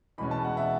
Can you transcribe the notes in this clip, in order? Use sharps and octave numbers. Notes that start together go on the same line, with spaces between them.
E2 B2 G#3 C#4 B5
A5
F#5
E5